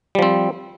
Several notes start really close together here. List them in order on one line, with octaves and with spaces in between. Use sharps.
G3 F3 C4